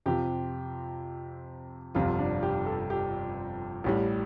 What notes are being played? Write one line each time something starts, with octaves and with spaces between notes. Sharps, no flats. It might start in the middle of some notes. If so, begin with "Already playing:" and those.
F2 C3 F3 G4
G1 F2 C3 F4
D4
G4
A4
G4
A1 A2 G3